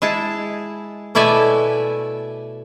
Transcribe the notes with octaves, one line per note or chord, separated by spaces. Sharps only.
G#3 E4 G#4 A5
B2 A3 E4 D5 E5 G#5